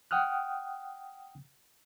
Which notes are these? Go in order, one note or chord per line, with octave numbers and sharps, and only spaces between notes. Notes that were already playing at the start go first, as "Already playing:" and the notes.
F#5 G5 D#6 F6 F#6